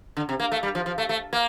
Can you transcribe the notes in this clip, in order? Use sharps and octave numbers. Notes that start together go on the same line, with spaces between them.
D3
C3
A#3
A3
G3
F3
F3
A3
A3
A#3